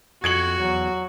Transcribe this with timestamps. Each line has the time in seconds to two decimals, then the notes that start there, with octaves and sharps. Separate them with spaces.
0.24 F2 F#4 G#6 C#7 F#7
0.59 E2 F#3